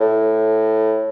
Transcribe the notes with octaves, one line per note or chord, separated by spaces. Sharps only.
A2